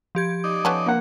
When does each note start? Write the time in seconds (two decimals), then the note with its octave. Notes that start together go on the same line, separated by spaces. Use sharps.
0.15 F3 G4 G#6
0.44 D#4 D5
0.65 F3 B3 C#4 A4
0.86 A#3 F#5